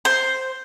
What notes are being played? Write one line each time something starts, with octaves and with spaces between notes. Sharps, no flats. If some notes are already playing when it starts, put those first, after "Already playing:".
C5